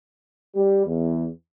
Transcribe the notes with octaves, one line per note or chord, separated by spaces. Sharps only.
G3
E2